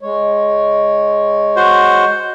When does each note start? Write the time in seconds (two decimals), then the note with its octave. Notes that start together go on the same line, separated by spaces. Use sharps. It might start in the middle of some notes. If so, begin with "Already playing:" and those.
0.01 G#3 C#5
1.56 F#4 C5